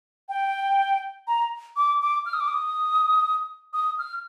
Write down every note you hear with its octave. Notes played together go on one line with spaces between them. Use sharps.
G5
A#5
D6
D6
F6
D#6
D6
D#6
D#6
F6